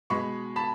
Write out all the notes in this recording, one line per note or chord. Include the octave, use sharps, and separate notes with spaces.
B2 G#3 B5 C#6
A5 B5